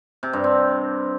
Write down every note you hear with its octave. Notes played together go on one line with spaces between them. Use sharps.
C3
G2
C4